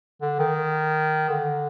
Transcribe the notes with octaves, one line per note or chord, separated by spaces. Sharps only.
D3
D#3
D3